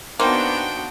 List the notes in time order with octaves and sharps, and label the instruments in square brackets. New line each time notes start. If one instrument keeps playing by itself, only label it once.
[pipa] A#3 [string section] B3 D4 F#4 [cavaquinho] D#4 C5 [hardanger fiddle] G5